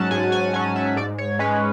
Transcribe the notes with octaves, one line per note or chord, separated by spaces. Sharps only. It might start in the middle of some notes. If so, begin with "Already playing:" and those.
Already playing: G#2 F#3 C#4 F#5 A5
G#2 G#5
G#5
F#3 C#4 G#5
E5
G#2 D5
C#5
G#3 C#4 B4